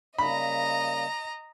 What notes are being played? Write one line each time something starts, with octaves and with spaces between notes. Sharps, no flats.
C#3 G3 A#3 D#5 A#5 B5